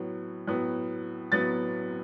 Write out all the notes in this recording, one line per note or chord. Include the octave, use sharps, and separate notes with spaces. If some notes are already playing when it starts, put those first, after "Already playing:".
Already playing: A2 F#3 B3
A2 F#3 B3
A2 F#3 B3 A6